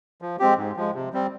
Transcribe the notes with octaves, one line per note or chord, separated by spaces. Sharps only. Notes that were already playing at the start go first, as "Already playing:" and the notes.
F3
G#3 C4 G4
G#2
F3 G#3
C3
G3 C4